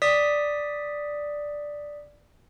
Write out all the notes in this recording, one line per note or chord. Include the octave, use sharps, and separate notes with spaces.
D5 D#6 B6